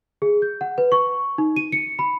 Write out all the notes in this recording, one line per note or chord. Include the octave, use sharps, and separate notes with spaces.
G#4
G6
F#5
B4
C#6
D#4
D#7
C#7
B5